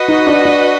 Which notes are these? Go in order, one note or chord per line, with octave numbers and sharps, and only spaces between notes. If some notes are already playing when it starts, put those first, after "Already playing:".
Already playing: F#4 B4 D#5
D#4
D4
D4